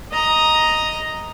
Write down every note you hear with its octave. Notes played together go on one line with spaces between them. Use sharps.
D#5 A#5